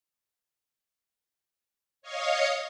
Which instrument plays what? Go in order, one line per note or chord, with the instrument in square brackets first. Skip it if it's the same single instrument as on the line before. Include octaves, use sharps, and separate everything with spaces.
[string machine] C#5 D#5 F5 C#6 D#6